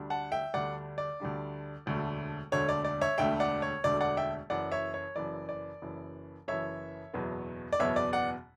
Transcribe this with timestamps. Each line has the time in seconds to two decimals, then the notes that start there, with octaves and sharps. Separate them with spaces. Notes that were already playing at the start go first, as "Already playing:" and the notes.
Already playing: D2 D3 G3 D4
0.10 F#5 A5
0.32 E5 G5
0.54 D2 D3 G3 D4 D5 F#5
0.98 D5
1.20 D2 D3 G3 D4
1.86 E1 D2 D3 A3
2.52 E1 D2 D3 A3 C#5
2.69 D5
2.85 D5
3.01 C#5 E5
3.18 E1 D2 D3 A3 E5 G5
3.40 D5 F#5
3.62 C#5
3.84 E1 D2 D3 A3 D5
4.01 D5 F#5
4.17 E5 G5
4.50 F#1 F#2 E3 D5 F#5
4.72 C#5 E5
4.94 C#5
5.16 F#1 F#2 E3 D5
5.49 D5
5.82 F#1 F#2 E3
6.48 F#1 F#2 E3 C#5 E5
7.14 F#1 E2 B2 F#3 B3
7.73 D5
7.79 F#1 E2 B2 F#3 B3 C#5 E5
7.96 D5
8.13 D5 F#5